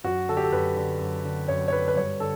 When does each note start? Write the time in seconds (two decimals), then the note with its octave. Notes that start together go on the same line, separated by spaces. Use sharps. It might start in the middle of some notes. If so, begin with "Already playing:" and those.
0.04 F#2 F#4
0.28 D3 A4
0.37 G4
0.43 A4
0.52 F#2 B4
0.77 D3
1.01 F#2
1.24 D3
1.48 F#2 C#5
1.68 C#5
1.72 D3 B4
1.88 B4
1.96 G2 C#5
2.20 D3 A4